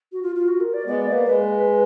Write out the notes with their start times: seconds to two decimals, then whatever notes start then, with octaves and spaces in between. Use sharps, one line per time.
0.12 F#4
0.23 F4
0.35 F4
0.48 F#4
0.60 A#4
0.74 D5
0.86 G#3 B3 D5
0.99 D5
1.06 A#3
1.12 B4
1.25 G#3 B4